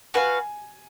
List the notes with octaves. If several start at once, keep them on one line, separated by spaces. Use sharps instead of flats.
F#4 B4 F5 G#5